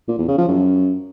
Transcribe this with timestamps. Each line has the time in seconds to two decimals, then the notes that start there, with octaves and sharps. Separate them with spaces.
0.08 A#2
0.18 E2
0.28 C#3
0.38 F3
0.48 F#2